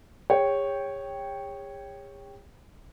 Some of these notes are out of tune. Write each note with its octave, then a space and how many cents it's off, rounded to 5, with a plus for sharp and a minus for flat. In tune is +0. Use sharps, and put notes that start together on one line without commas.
G#4 -45 C#5 -5 G5 +0